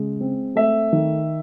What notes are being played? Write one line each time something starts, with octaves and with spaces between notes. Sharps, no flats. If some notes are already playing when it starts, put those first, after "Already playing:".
Already playing: C#3 G#3
C4
A3 E5
D#3